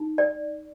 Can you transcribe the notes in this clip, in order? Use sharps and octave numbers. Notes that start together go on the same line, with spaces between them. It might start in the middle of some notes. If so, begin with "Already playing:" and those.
Already playing: D#4
D5